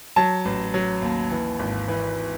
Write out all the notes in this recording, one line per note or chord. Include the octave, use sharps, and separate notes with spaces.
F#3 A5
A1
F#3
D#2
E3
G#1
E3